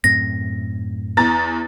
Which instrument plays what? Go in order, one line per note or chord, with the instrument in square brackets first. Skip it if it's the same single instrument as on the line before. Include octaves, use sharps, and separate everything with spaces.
[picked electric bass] F#2 A2 C4 [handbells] A#6
[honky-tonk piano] E2 A#5 A6